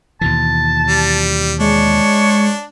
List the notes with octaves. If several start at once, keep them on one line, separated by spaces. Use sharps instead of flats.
D#2 B2 E3 A5
G3
G#3 D4 C#5